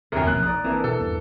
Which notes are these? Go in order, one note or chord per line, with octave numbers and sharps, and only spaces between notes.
C2 F#2 A#4 C#5
B2 F3 A#3 F#6
B1 D#4 D5
E3 A#3 C4 D4
B2 A4
E2 G2 B3